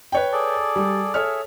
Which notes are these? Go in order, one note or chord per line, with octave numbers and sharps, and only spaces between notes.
B4 C#5 G5
G#4 A4 D5
G3
G#4 A4 C#5 E5 F6